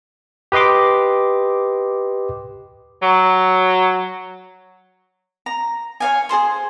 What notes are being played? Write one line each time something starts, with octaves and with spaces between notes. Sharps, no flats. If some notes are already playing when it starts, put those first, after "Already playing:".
G4 B4 D#5 C6 D6
F#3
A#5
C#5 F5 G#5
G#4 A4 C5 C6